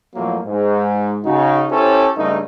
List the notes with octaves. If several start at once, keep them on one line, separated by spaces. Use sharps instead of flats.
F2 A2 F3 F#3 A#3
G#2
C#3 D#4 F#4
C#4 E4 G4 A4 C5 C#5
G2 C#3 A3 D#4